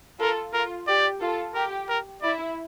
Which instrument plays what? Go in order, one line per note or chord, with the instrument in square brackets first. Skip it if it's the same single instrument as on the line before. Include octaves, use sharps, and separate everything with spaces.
[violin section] F4 A4 [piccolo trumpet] A#4
[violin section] F4 [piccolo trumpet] A#4
[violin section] G4 [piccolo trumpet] D5
[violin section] F4 A4
[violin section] G4 [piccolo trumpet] A#4
[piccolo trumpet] A#4
[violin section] E4 [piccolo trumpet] D5